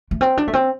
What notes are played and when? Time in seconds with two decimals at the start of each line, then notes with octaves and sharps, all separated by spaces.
0.11 A3
0.21 C4
0.37 D4
0.48 A3
0.53 C4